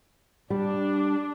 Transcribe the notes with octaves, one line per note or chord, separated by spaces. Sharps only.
G3 D4